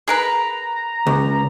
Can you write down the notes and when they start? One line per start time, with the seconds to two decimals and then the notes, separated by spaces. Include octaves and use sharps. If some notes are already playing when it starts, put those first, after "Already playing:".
0.08 G#4 A#4 B4 A#5
1.07 C#2